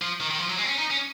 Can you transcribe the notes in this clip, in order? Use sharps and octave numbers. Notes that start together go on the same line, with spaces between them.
F3
D#3
D#3
F3
F#3
G#3
C4
C#4
D#4
C#4